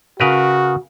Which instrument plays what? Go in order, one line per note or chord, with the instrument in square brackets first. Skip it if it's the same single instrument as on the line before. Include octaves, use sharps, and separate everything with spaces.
[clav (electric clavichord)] C#3 A#4 B4 [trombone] F#4